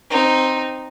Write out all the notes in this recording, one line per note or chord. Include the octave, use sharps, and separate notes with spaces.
C4 D#4